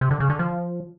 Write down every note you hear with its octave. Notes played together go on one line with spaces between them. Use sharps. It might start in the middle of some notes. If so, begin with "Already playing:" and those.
C3
D3
C#3
D3
F3